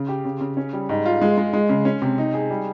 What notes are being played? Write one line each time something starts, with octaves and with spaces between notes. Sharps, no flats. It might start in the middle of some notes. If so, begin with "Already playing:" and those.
Already playing: C#3
G4
C#3
C#3
C#4
G3
G#2
F4
G#3
G#3
G#3
C#3
C#4
C3
D#4
G#4
G3